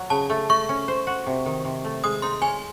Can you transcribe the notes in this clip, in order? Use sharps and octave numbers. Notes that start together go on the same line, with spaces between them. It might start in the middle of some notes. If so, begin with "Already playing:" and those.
Already playing: F#3
C#3 A5
A3
A3 C#6
C#4
C5
F#4
C3
D#3
C3
A3
G#3 D#6
D#4 C6
C#5 G#5